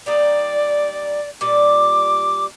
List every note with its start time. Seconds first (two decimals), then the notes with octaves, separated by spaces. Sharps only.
0.06 G3 A#3 D#4 D5
1.41 A#2 G3 D5 D6